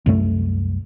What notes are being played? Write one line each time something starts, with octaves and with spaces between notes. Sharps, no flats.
C2 F#2 A3